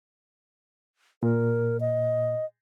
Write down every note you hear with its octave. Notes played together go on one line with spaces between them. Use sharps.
A#2 A#4
D#5